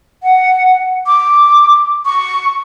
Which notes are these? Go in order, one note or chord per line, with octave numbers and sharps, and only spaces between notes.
F#5
D6
C#6